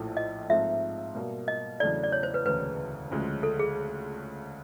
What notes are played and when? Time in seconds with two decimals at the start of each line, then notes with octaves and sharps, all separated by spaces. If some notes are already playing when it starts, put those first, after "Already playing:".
Already playing: A#1 A2 F3 A3
0.17 D#5
0.49 G#2 F3 A3 C4 F4 E5
1.15 B2 G3 A#3
1.48 D#5
1.80 E2 C#3 F#3 A3 D4 D5
2.04 D5
2.12 C#5
2.23 C5
2.34 B4
2.45 E1 D2 C#3 B4
3.11 D2 C#3 F3 G#3 C#4
3.43 A4
3.59 G#4